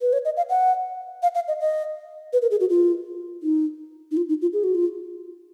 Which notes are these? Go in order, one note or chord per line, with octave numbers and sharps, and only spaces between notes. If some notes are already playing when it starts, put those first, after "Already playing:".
B4
C#5
D#5
F5
F#5
F5
F5
D#5
D#5
B4
A#4
G#4
F#4
F4
D#4
D#4
F4
D#4
F4
G#4
F#4
F4